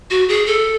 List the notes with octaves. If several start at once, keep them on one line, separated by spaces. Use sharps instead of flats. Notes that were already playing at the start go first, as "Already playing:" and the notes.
F#4
G#4
A4